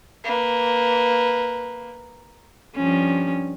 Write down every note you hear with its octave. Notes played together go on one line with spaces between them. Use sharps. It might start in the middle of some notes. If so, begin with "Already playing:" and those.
A#3 B4
G2 F3 C#4